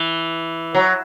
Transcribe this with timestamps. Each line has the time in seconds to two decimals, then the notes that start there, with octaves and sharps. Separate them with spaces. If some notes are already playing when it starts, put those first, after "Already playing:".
Already playing: E3
0.75 F#3